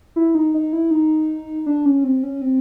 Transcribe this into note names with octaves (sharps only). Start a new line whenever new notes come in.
E4
D#4
D#4
E4
D#4
D4
C#4
C4
C#4
C4